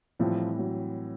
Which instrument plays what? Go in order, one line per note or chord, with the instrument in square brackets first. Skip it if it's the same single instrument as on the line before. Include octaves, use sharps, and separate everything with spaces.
[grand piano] A2 E3 G3 C4 [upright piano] F3
[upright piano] F#3